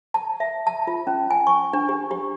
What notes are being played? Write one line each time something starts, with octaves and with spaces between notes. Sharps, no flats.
A5
E5
A5
F4
C#4
G#5
C#6
D4
G4
G4